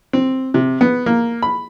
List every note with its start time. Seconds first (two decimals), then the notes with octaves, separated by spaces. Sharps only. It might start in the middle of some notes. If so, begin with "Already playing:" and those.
0.13 C4
0.54 C3
0.81 B3
1.06 A#3
1.43 B5